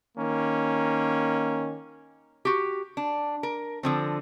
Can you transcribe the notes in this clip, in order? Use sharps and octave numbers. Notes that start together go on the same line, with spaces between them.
D#3 A#3 C#4
F#4 G4
D4
A#4
D3 F3 C4